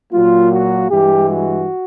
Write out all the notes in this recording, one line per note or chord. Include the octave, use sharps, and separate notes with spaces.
A#2 F#3 A#3 F4
F#4
G2 E3 G#3 G4
F#4